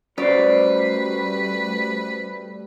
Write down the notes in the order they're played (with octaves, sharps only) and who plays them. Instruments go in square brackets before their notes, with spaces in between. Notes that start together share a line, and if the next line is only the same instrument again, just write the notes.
[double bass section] G3 A3 [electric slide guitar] C#4 F#4 C5 [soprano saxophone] B4 [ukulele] D5